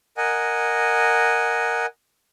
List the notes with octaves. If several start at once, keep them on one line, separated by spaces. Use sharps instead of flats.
A#4 D#5 F#5 G#5